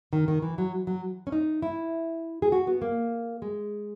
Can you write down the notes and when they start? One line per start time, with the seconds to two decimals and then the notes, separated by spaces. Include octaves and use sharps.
0.13 D#3
0.28 D#3
0.42 E3
0.58 F#3
0.87 F#3
1.27 C#4
1.32 D#4
1.62 E4
2.42 G#4
2.52 F#4
2.67 B3
2.82 A#3
3.42 G#3